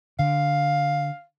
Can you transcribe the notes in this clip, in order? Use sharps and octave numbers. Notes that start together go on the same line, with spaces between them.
D3 F5